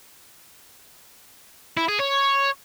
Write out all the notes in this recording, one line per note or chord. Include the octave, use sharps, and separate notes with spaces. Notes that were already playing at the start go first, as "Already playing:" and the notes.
E4
G#4
C#5